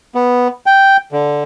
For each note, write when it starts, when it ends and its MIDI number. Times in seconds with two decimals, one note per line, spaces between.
0.15 0.48 59
0.66 0.97 79
1.12 1.44 50